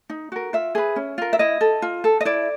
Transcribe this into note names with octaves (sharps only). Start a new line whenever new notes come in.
D#4
F#4 A#4
F4 E5
G#4 B4
C#4
F4 A#4
E5
E4 D#5
A4
F4
A4
D#5
E4 D5